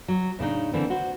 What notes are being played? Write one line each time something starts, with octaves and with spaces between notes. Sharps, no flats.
F#3
A2 C#3 D4 D#4
D3 E3 A#3 C4
F#4 C5